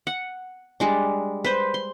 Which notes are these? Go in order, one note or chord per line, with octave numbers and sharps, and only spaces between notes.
F#5
G3 G#3 D4
B4 C5
C6